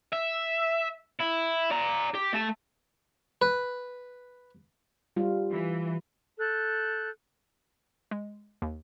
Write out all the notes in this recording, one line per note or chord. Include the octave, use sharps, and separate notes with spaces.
E5
E4
D5 A#5
G4
A3 A5
B4
G3 F4
E3
A4 F#6 G6
G#3
D#2